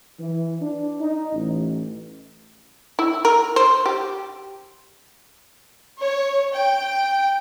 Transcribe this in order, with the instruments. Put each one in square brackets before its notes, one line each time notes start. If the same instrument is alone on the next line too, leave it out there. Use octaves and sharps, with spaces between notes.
[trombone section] E3
D4
D#4
A1
[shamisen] E4
A#4
C5
G4
[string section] C#5
G5